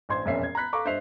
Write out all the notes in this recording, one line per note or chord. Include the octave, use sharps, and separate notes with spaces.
A1 D4 C5 C6 G#6
E1 F2 A#2 C#4 E5 C7
G#6
A#5 B5 F#6 B6
A4 F5 A#5 C#6 D6
G2 C5 D#5 E5 C7 F7